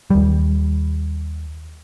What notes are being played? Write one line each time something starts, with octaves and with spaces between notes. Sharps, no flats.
D#2 G3